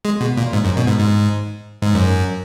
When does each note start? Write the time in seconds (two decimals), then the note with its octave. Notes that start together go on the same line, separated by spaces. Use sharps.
0.05 G#3
0.21 B2
0.37 A#2
0.53 G#2
0.65 F#2
0.77 B2
0.87 G#2
0.99 G#2
1.82 G#2
1.95 F#2